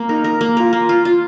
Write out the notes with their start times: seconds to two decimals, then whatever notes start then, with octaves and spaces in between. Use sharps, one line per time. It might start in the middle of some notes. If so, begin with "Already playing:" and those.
Already playing: A#3
0.09 D#4 A#4
0.24 A#4
0.41 A#3
0.57 F4 A#4
0.73 A#3
0.89 F4
1.05 F4